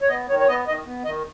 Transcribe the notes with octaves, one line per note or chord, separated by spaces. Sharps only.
C#5
B3 D#5
D#3 C#5
C#5
B3 D#5
D#3 D#5
B3
D#3 D#5